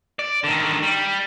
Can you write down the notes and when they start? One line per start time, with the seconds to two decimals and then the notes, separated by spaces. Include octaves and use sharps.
0.19 D5
0.44 D3 D#3
0.82 G3